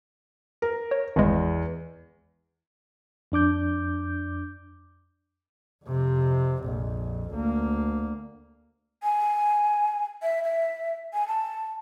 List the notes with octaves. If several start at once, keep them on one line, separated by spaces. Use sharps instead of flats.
A#4
C#5
G#1 E2 G#3
F2 D4 D6 G6
F2 C3
A#1 F2
D2 A#3
G#5
E5
E5
G#5
A5